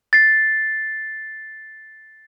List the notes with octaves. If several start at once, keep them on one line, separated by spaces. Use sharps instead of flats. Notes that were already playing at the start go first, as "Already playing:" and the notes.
A6 C7